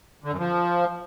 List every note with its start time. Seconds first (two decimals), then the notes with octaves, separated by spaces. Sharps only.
0.24 D3
0.32 F#2
0.39 F3